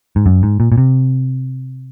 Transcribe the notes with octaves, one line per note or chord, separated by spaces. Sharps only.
G#2
F#2
G#2
A#2
A#2
C3